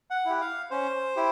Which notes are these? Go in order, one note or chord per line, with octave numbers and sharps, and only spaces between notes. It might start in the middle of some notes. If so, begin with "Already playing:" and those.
F#5
E4 G4
F5
C#4 C5
E4 G4